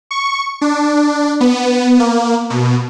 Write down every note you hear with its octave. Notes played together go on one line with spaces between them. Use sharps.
C#6
D4
B3
A#3
B2